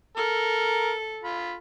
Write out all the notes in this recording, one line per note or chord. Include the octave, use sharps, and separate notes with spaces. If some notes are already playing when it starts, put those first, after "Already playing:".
A4 A#4
F4 B5